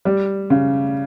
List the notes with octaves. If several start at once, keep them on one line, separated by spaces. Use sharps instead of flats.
G3
C#3